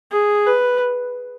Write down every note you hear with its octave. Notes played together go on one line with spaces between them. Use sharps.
G#4
B4